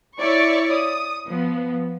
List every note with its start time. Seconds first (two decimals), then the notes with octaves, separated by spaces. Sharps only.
0.21 E4 C#5 D5 C#6
0.72 D#6
1.28 F3 B3